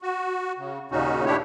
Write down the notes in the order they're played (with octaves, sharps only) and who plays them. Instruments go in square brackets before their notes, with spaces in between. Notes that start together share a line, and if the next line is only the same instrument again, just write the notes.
[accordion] F#4
C#3
D#2 A#2 C#3 C#4 D#4 F#4
A3 D4 E4 G4 C#5